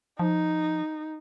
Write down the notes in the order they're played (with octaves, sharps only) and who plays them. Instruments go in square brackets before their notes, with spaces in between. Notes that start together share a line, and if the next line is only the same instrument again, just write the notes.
[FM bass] F3 [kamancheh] D#4